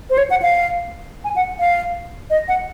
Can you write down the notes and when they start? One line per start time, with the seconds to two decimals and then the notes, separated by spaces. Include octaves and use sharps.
0.10 C5
0.18 C#5
0.30 F#5
0.42 F5
1.24 G#5
1.36 F#5
1.59 F5
2.30 D#5
2.48 F#5